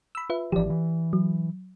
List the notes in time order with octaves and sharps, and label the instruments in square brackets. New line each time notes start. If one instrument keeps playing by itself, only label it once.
[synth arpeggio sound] B5 E6
F4 B4 E5
[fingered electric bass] G#1 E3 F3 [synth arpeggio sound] G4 D5
[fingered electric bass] E3
[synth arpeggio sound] F#3